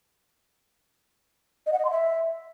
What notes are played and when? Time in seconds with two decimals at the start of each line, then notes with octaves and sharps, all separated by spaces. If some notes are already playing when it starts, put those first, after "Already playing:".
1.66 D#5
1.73 F#5
1.79 D#5
1.85 C6
1.91 E5